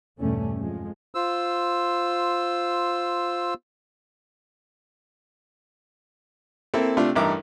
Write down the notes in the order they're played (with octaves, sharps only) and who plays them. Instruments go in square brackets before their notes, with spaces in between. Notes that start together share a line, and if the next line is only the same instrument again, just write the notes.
[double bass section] E2 G2 B2 G3 A3 C#4
F2 F3 G#3
[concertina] F4 C5 E6
[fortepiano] A#3 C4 E4 A4
C3 A3 D4 F4
A1 G2 D#4 A#4 E5 D6